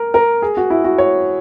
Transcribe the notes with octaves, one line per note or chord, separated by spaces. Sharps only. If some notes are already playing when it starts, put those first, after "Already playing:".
Already playing: A#4
A#4
G#4
F#4
E4
F#4
C#5